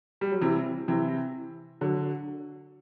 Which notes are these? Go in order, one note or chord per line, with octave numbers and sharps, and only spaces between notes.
G3
F#3
C3 E3
C3 E3
D3 F#3